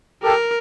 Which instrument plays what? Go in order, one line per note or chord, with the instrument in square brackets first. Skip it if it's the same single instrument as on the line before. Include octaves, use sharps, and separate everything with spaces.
[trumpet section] G4 A4 [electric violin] A#4